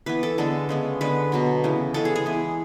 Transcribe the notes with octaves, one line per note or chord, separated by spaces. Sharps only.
E3 B3 B4
A4
D3 G#3 B3 A4
C#3 G#3 B3
D3 G#3 B3 B4
B2 F#3 B3
C#3 E3 B3
C#3 G#3 B3 A4
G#4
G#4
E3 B3